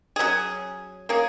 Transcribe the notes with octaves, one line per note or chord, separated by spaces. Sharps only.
F#3 C#4 G#4
A#3 C#4 G#4